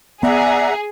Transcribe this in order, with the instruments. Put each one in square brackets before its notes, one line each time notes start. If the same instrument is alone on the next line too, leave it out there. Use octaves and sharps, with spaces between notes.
[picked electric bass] B3 [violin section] G#4 [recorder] D5 [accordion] E5 F#5 A#5